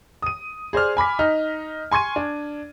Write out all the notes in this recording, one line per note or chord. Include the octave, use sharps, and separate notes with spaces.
D#6 D#7
G#4 C5 D5 F6
G#5 B5 D6 B6
D#4 D#5 F6
G#5 C6 C#6 G#6 D#7
D4